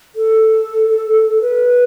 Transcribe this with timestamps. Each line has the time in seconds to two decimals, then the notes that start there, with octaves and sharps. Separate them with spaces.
0.16 A4
1.41 B4